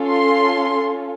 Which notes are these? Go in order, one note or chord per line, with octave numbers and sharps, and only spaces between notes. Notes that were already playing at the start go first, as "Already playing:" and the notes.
Already playing: C#4 F4 A4
C6